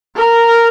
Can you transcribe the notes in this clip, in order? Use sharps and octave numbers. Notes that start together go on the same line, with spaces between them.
A#4